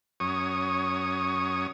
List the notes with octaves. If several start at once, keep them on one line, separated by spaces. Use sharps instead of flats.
F#2 C#5 D#6